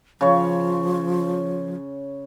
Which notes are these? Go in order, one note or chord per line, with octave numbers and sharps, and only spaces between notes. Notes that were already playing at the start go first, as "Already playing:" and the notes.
C#3 F3 C#5